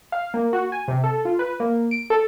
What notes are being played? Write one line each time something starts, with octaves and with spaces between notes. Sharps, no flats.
F5
A#3
F#4
G#5
C3
A4
F4
B4
A#3
D7
A4